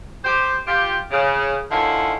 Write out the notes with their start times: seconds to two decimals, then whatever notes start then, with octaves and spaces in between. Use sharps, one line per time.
0.24 G4 C5
0.67 F4 G4
1.11 C#3
1.71 D3 D#3 C#4 E4 F4